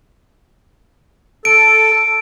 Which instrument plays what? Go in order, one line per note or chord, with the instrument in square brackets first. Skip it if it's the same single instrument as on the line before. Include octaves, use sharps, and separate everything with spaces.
[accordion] A4 [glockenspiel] D7